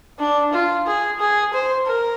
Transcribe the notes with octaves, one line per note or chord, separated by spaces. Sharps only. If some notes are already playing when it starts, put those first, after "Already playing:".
D4
F4
G#4
G#4
C5
A#4